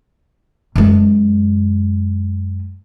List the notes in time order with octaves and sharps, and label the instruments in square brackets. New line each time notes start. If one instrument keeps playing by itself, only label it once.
[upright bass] F#2 G#3